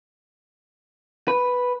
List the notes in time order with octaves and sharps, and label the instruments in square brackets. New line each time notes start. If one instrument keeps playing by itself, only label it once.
[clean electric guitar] B4